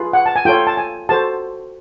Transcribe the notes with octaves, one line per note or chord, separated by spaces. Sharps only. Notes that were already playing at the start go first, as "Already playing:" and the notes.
Already playing: F4 G#4 B4
F#5
A5
G#5
F4 A4 C#5 G5
A5
G#5
F#4 A4 C5 A5